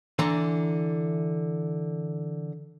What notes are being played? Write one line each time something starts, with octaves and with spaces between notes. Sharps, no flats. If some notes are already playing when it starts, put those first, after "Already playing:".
D3 E3 A#5 C6